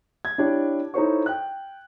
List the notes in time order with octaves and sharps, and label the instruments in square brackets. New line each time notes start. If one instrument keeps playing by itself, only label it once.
[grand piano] G#6
D4 E4 G4 C#5 D5
D#4 E4 A4 C5 C#5 C#6
G5 F#6